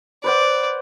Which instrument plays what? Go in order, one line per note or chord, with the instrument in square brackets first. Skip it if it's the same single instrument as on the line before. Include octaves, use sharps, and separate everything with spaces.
[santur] B4 C5 F#5 [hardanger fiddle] D5